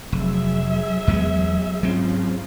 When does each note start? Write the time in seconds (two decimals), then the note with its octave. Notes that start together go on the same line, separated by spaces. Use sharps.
0.12 F1 F#3 G#4 E5
1.07 E2 G#3 B3
1.83 G#2 C#3 F3 F#3 C4